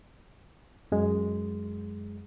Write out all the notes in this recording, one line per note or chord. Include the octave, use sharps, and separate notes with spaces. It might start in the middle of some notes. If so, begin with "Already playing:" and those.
F#2 G#3